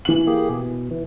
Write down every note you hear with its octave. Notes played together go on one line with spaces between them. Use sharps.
E3 F#7
A#3 G4 G#4
B2
E3